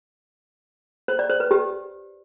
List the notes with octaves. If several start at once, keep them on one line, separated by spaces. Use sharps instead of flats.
C5
D5
C5
B4
G4